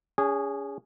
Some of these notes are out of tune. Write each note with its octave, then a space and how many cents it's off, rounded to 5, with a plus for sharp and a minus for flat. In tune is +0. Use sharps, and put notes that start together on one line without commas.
C#4 +35 G#4 -20